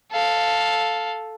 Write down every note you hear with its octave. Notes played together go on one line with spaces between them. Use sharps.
A4 F5